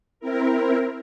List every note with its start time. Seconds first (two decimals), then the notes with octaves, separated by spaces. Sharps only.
0.20 C4 E4 A#4